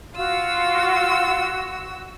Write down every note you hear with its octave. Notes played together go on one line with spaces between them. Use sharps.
F4 F#4 F5 E6